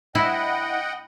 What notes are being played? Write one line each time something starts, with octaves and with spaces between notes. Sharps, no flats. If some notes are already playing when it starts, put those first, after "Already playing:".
E4 D#5 F#5 G5